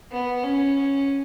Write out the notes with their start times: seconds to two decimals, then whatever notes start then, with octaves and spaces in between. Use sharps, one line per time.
0.12 B3
0.43 C#4